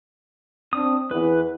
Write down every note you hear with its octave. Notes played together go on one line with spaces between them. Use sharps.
C4 D4 D#6
E2 E3 B4